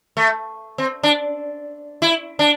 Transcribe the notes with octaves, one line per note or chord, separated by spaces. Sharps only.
A3
C4
D4
E4
D4